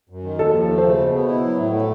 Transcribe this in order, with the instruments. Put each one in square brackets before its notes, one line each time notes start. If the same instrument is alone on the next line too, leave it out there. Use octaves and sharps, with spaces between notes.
[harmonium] F#2
D#3
[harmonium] D#2 [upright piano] A4
[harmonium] F3
A3
[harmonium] C#3 [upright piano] C5
[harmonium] B2
B3
E4
F#3
A2
A3